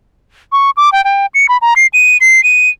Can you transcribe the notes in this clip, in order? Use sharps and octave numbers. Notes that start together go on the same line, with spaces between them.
C#6
D6
G5
G5
C#7
B5
A#5
C7
D#7
C7
D#7